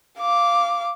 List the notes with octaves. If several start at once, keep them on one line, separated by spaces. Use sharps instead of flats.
F5 D6